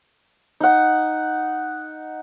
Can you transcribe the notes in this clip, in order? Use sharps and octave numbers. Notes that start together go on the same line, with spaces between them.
D#4 F#5